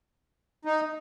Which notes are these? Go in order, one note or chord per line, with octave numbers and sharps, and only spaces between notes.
D#4